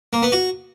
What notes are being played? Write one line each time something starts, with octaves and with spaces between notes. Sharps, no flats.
A#3
B3
F#4